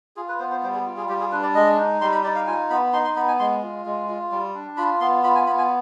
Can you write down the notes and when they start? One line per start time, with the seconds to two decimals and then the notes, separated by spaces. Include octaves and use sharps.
0.16 F4 G#4
0.29 B4
0.39 B3 C5
0.51 C5
0.63 G3 C5
0.74 G#4
0.86 F4
0.97 G#4
1.09 G3 G4
1.20 G#4
1.31 D4 B4
1.43 D5
1.55 G#3 D#5
1.78 D#4
2.01 G3 C6
2.12 B5
2.24 D#4 D5
2.35 F5
2.47 F4 G#5
2.70 B3 B5
2.93 D#4 C6
3.04 C6
3.16 B3 B5
3.28 G#5
3.39 G#3 C6
3.62 F4
3.85 G#3
4.08 F4
4.32 G3
4.55 D4
4.77 F4 B5
5.00 B3 C6
5.24 F4 B5
5.35 G#5
5.47 B3 B5
5.58 G#5